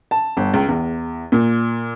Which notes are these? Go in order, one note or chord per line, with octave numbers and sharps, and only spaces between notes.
A5
G1
C#2
E2
A#2